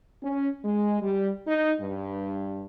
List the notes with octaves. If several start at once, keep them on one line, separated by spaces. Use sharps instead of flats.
C#4
G#3
G3
D#4
G2